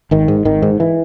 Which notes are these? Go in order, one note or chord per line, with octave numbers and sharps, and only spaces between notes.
G#1 D#3
G#2
G#1 D#3
G#2
E3